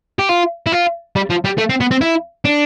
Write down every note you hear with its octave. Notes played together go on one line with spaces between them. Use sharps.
G4
F4
E4
F4
G3
F3
G3
A3
C4
B3
C4
E4
D4